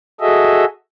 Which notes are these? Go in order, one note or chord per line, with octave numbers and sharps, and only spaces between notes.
F#4 G#4 A4 D#5 E5